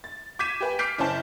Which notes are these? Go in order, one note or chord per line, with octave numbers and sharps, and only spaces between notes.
A6
D6 G6 G#6 B6 D#7 E7
G4 B4 G#5
D6 F6 G6 B6 C7 D7
F#1 C#4 E4 C5 A5